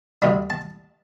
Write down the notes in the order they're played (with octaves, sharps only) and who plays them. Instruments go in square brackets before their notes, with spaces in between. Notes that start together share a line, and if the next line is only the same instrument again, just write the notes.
[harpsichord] D2 C3 G3 D4 B5
A5